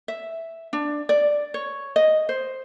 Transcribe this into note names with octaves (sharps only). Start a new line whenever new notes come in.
E5
D4
D5
C#5
D#5
C5